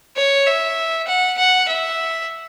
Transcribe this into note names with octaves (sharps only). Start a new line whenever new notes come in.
C#5
E5
F#5
F#5
E5